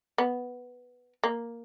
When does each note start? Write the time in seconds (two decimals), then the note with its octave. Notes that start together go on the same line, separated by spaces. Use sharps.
0.18 B3
1.24 A#3